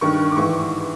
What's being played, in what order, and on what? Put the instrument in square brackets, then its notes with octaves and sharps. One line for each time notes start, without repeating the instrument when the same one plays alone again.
[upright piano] G2 D#3 C#6
D6
G#2 E3 C#6